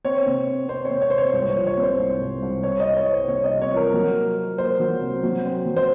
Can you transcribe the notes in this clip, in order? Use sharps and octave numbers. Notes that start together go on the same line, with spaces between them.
C4 C#5
C3
C4
C4 C5
C#5
C3
C#5
C3 C5
C#5
C2
C#5
C5
F3
C#5
C3
C5
C2
C2
C2
C4 C#5
C4 D#5
C#5
C4
C5
C3 C#5
D#5
C3
C#5
F3 A#4
F#3
A#3
A#3
A#3 C5
F#3
C3
F#3
C4
F#3
C5